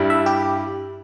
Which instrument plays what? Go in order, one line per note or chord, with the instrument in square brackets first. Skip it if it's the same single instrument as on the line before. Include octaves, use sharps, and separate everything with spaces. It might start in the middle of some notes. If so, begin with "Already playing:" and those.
Already playing: [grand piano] G2 G3 E4
[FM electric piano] E5
G4